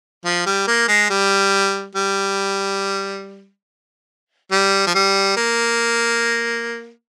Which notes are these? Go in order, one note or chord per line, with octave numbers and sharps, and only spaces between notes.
F3
G3
A#3
G#3
G3
G3
G3
F3
G3
A#3